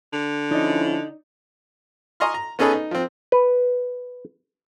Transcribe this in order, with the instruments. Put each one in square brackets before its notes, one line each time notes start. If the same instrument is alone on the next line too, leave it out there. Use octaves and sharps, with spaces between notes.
[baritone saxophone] D3
[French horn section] F3 C#4 E4 [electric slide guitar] D#4 D5 D#5
[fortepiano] D#5 G#5 A#5 C6 C#6 F6
A#5
B3 C#4 D#4 G#4 A4 B4
D#4
F3 C4
[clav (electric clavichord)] B4